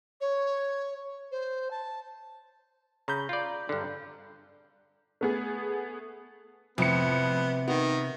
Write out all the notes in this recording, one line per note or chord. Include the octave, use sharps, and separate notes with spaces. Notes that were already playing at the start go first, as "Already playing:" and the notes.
C#5
C5
A5
C#3 A#5 B5 G6
F4 D5
G2 D3
A3 B3 G#4
F2 A2 C3 B3 C#7
D#3 B3